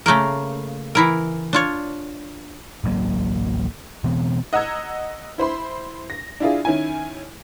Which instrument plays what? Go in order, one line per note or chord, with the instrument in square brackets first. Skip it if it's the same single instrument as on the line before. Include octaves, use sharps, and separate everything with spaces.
[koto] C#3 A3 A#3 A#4
E3 E4 A#4
D4 F4 C#5
[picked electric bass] D1 A1 F#3 A#3
B2 E3 B3 C4
[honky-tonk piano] D#5 F#5 A#5 E6 G#6
E4 C5 B5 C6
A#6
D4 E4 F4 G#4
D#3 C#4 E4 G#5